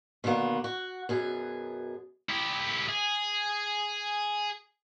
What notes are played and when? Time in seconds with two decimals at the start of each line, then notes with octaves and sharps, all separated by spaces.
0.24 B2 D3 D#3 A#3 B3
0.64 F#4
1.09 F#2 B2 G#4
2.29 E4 G4
2.88 G#4